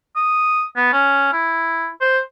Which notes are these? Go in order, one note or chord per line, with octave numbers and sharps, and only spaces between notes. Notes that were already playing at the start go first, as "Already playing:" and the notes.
D#6
B3
C#4
E4
C5